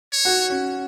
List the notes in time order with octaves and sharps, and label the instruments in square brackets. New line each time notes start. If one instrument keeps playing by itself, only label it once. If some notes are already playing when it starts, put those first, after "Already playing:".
[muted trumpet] C#5
[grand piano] F#4
C#4